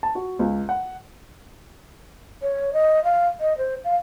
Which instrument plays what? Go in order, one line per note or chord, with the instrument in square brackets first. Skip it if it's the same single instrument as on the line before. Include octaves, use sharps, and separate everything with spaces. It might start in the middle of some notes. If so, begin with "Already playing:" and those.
[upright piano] A5
F#4
C#2
F#5
[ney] C#5
D#5
F5
D#5
C5
F5